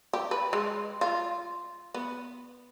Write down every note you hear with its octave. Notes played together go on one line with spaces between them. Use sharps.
G4
B4
G#3
F4
B3